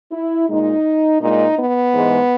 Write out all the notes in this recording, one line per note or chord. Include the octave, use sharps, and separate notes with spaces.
E4
A#2 G#3 D#4
A#2 G#3 D#4
B3
G#2 E3 G#3